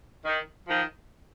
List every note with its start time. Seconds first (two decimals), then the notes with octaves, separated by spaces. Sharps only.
0.25 D#3
0.67 D#3 F3